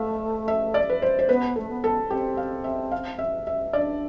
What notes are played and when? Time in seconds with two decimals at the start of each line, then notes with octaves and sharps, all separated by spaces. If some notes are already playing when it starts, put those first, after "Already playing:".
Already playing: A3 E5 F5
0.48 E5
0.74 D5
0.90 B4
1.02 C5
1.19 C5
1.29 B3 B4
1.56 A3 A4
1.69 B3
1.84 A4
2.10 C4 G4
2.37 F5
2.64 E5
2.91 F5
3.19 E5
3.47 E5
3.73 D4 D5